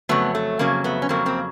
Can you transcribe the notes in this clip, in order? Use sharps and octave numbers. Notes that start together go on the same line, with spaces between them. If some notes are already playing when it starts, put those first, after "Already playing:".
F2 C#3 F#3 A3 B3
A3
F2 C#3 F#3 A#3
A3 B3
C#4
F2 C#3 F#3 A#3 C4
A#3 C4